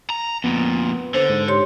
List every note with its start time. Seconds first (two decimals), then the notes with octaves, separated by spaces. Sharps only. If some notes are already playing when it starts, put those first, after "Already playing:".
0.10 A#5
0.44 F2 A#2 B3
1.14 D3 C5
1.29 G#2
1.48 G4 C#5 C6